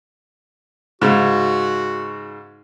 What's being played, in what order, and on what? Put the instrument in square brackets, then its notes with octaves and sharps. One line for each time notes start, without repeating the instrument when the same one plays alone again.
[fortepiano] G#2 C#3 [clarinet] F#4